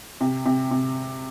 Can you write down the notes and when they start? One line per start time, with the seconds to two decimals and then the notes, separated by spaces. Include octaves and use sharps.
0.21 C3
0.46 C3
0.71 C3